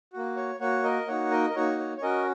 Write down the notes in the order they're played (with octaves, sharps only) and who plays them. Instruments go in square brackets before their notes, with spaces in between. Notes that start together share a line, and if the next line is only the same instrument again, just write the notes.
[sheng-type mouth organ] A#3 F#4
C#5
A#3 F#4 C#5 F#5
A#4 D#5
A#3 D#4 F#4 C#5 F#5
A#4 D#5
A#4
A#3 D#4 F#4 C#5
C#5
C#5
C#4 F#4 A#4 D#5